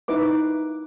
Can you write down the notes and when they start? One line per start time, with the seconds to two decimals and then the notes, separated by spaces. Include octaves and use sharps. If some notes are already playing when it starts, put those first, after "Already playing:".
0.08 D#4 E4 B4 D6